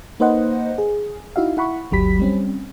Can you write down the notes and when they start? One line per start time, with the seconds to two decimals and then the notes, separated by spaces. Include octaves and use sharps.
0.20 A#3 D#4 B4 C5 D#5 F#5
0.78 G#4
1.36 D#4 E4 F#4 E5 F5
1.57 E4 F#5 B5 C#6
1.91 G1 D2 F#3 G4 B5 B6
2.19 G3 C4 C#4